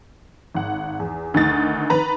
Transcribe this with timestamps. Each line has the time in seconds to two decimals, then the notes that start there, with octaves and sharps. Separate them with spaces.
0.55 G#1 F#5
1.00 E2
1.34 D2 D#3 D#4 A6
1.90 D#3 B4 A#5